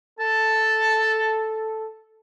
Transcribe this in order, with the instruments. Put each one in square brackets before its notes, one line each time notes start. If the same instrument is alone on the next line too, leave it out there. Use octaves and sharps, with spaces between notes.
[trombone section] A4 [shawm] A5